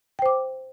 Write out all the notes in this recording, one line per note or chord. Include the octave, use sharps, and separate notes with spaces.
C5 G5 D6